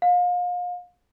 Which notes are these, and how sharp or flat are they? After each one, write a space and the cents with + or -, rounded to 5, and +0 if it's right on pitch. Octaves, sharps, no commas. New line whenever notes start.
F5 +35